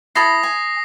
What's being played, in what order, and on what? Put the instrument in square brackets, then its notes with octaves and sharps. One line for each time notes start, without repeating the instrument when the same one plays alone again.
[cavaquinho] E4 A4 B5 [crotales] D#6 A#6 C7
[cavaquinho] G#5